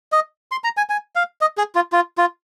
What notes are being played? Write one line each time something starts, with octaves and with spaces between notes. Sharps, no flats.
D#5
C6
A#5
G#5
G#5
F5
D#5
G#4
F4
F4
F4